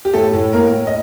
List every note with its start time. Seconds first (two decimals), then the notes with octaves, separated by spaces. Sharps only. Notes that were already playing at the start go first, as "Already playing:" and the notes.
0.05 G4
0.13 A2 A3 A4
0.33 A2
0.53 A2 A#3 A#4
0.73 A2
0.87 D#5